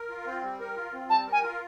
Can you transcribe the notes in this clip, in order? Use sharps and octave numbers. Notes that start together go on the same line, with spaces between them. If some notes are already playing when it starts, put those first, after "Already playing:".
Already playing: A#4
F4
C4
G3
A#4
F4
C4
G3 A5
A#4
G#5
F4